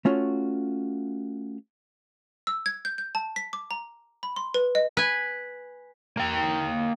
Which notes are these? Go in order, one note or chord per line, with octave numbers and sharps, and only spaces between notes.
A3 C#4 F4 F#4
E6
G#6
G6
G6
A5
B6
D6
A#5
B5
C6
B4
D#5
B4 G#5
A#3 G5